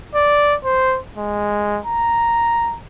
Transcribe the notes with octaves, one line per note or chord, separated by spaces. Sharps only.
D5
C5
G#3
A#5